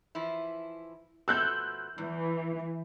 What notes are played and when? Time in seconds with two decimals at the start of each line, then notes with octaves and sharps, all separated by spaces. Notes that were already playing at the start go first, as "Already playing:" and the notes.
0.15 E3 F3 E4
1.28 B2 F3 A3 E6 F#6 G6
1.98 E2 E3